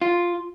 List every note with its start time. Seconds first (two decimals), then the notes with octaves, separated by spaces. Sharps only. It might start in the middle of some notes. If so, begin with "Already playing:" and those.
0.01 F4